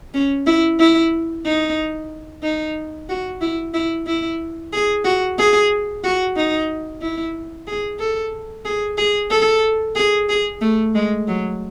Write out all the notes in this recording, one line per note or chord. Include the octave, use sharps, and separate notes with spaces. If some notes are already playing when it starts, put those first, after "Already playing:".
C#4
E4
E4
D#4
D#4
F#4
E4
E4
E4
G#4
F#4
G#4
F#4
D#4
E4
G#4
A4
G#4
G#4
A4
G#4
G#4
A3
G#3
F#3